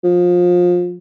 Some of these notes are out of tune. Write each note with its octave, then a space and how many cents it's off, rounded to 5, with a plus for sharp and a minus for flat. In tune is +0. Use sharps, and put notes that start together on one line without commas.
F3 +25